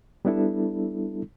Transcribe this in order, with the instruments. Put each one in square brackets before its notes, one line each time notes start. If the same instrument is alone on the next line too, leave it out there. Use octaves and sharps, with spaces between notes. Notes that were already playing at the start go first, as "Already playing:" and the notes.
[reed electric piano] G3 B3 D4 E4 A4